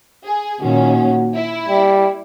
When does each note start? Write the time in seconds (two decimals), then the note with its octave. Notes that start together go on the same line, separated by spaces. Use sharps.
0.24 G#4
0.62 A#2 D#3 C#4 F#4
1.35 E4
1.68 G3